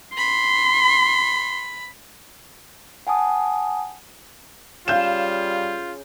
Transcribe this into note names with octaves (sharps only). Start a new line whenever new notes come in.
B5 C6
F#5 G#5 A5 D#6
C#3 G3 F4 F5 G6 E7